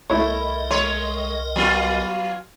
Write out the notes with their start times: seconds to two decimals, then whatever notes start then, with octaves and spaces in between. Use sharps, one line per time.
0.10 C2 A3 E4 A#4 C#5 D#5
0.71 G#3 C#5 C6
1.56 F#3 B3 F4